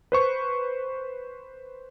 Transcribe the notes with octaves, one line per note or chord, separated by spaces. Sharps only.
B4 C5 C#6